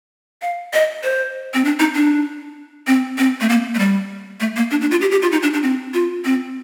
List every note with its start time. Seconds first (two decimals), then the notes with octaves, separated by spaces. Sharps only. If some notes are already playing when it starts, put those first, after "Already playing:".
0.42 F5
0.73 D#5
1.03 C5
1.54 C4
1.65 D4
1.79 D#4
1.95 D4
2.87 C4
3.18 C4
3.41 A3
3.49 A#3
3.75 A3
3.79 G3
4.40 A3
4.56 A#3
4.71 D4
4.81 D4
4.91 F4
5.01 G4
5.11 G4
5.22 F4
5.32 D#4
5.43 D4
5.53 D4
5.63 C4
5.94 F4
6.25 C4